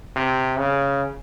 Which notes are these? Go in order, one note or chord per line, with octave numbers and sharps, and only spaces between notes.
C3
C#3